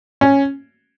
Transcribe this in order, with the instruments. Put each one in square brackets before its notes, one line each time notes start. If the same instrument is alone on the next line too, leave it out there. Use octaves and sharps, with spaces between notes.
[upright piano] C#4